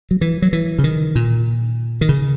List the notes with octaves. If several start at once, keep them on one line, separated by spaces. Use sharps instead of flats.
F#3
E3
F#3
E3
C#3
D#3
A#2
D#3
C#3